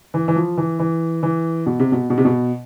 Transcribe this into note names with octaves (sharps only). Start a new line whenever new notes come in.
E3
E3
F3
E3
E3
E3
B2
C3
B2
B2
C3
B2